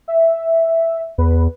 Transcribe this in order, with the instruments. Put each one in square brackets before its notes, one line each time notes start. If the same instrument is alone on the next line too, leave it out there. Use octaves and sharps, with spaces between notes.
[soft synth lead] E5
[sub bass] E2 [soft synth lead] B4